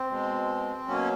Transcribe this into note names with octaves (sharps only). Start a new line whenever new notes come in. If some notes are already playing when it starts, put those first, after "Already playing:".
Already playing: C4
B2 G#3
B2 F#3 A#3 C#4